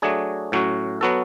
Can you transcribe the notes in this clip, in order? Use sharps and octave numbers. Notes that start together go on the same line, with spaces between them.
F#3 A3 D4 G#4
A2 F#3 C#4 F#4
F#3 B3 F#4 A4